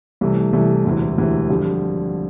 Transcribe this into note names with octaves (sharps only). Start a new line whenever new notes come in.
C2 C3 E3 A3
C2 C3 E3 A3
E1 D2 C3 E3
E1 D2 C3 E3
F2 D3 G3